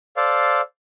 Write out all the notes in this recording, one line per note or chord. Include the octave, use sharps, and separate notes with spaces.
A4 C5 D5 F5